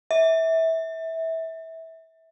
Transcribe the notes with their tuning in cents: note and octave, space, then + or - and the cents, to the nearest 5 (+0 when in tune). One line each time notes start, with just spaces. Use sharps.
E5 -20